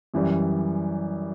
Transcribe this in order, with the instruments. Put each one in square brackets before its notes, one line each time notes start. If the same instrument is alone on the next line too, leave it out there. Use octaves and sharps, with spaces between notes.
[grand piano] F#2 E3 G3